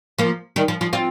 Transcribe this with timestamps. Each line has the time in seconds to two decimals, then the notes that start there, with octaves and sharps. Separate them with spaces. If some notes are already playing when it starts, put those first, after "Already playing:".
0.19 F3 A#3
0.56 D#3 G3
0.68 F3
0.81 F3
0.93 C4 F4